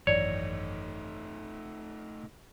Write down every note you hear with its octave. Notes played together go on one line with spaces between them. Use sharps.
G#1 F#2 E3 A3 D#4 C#5 D5